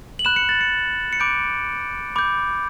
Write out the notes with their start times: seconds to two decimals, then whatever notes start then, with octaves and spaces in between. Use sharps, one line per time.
0.19 F#7
0.25 B5 F#6 E7
0.36 C#7
0.49 A6
0.61 C#7
1.13 C#7
1.20 B5 D6 G6 D7
2.16 B5 D6 G6